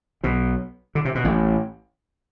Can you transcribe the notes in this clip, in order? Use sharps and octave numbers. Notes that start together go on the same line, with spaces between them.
B1 B2
D3
C3
B2
A1 A2